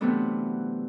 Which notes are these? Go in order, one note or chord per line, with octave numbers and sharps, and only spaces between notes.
C3 E3 F#3 A3 B3 D4